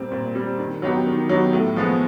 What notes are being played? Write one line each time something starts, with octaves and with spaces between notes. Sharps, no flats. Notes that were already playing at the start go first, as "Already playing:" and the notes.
Already playing: A#2 G3 C4
A#2
G3 C4
D#3
F#3 B3 D#4 G4
D#3
F#3 B3 D#4 G4
A2
F3 G#3 B3